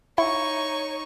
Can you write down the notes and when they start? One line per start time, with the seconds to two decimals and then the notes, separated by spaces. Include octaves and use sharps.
0.18 D#4 E4 C#5 C#6